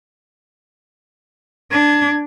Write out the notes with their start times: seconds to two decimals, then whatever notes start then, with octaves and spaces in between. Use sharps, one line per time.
1.71 D4 G#6